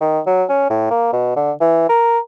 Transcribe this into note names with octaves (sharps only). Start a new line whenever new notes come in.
D#3
F#3
C#4
A2
A#3
B2
D3
E3
A#4